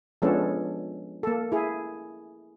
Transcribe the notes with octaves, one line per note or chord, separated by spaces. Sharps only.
F3 G#3 B3 C#4 D4 A4
A#3 A4
E4 G#4